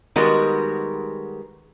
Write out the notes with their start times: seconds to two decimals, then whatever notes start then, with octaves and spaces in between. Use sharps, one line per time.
0.16 D#3 G3 G#3 B3 F#4 A#4